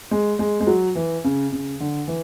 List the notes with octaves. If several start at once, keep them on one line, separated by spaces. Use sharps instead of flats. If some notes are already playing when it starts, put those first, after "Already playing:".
G#3
G#3
G#3
F#3
E3
C#3
C#3
D3
E3